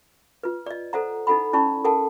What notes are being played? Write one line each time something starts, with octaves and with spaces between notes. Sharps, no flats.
F4 B4
D5 D#5
A4 C5 F#5 A#5
D#4 E4 A4 F#5 B5
C#4 E4 D5 A5 B5 C#6
A4 A#4 F#5 G#5 A5